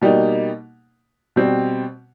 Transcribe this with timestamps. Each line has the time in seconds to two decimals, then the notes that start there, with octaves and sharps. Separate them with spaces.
0.01 B2 G3 A#3 D#4
1.36 B2 G3 C4